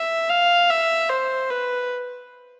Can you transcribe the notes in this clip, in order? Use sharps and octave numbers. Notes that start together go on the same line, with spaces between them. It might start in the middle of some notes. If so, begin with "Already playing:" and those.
Already playing: E5
F5
E5
C5
B4